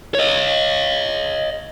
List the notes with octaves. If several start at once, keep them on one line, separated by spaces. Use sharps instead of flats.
C#5 D#5